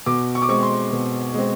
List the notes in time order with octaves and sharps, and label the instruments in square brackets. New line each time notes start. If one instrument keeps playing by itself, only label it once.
[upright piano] B2 D6
C#6
D6
G#3 C4 C#6
C6
B2
G#3 C4